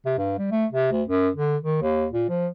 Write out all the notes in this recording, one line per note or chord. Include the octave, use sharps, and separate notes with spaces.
C3
G2
G3
A3
C3
D2
F#2
D3
D#3
D#2
A#2
F3